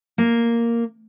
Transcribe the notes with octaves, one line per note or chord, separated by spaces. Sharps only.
A#3